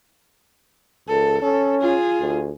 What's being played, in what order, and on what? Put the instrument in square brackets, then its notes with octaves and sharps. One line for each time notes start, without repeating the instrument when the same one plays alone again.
[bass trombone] C#2 [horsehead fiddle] A4
[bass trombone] C#4 [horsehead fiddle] A4
[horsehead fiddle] F4 G#4
[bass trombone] D2